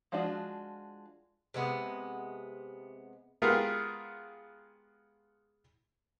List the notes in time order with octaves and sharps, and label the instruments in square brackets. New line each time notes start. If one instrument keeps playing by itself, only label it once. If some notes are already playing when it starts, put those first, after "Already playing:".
[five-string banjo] F3 G#3 D4 F4 F#4
[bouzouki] C3 G#3 B3
[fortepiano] G#3 B3 F4 G4 G#4 A#4